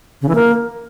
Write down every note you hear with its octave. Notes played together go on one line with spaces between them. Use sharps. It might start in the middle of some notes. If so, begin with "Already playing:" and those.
C#3
E3
A#3